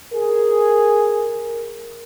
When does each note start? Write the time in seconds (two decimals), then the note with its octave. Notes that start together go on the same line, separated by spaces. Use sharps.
0.14 G#4 A#4